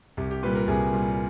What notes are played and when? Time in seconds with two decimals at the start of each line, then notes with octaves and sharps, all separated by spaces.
0.17 C2 G4
0.31 G4
0.43 A#2 G3 B4
0.55 A#4
0.68 C2 G#4
0.93 A#2 G3